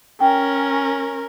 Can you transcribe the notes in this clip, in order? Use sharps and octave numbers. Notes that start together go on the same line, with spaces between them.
C#4 A#4 G5